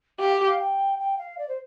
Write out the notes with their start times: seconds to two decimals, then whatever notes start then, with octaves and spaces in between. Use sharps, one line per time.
0.20 G4 F5
0.33 G5
0.46 F5
0.59 G5
1.00 G5
1.18 F5
1.38 D5
1.48 C5